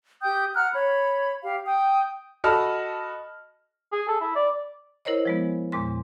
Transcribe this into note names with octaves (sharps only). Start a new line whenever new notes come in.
G4 G5 D#6 G6
F#5 A#5 F6 F#6
C#5 B5
G4 F5
G5 D#6
F#4 A4 D#5 A5 B5 F6
G#4
A4
E4
D5
E4 A#4 C5 C#5 D#5
F3 G#3 B3
E2 A#2 G#3 C6